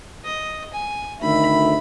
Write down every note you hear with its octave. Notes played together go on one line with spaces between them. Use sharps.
D#5
G#5
D2 D#3 E5 B5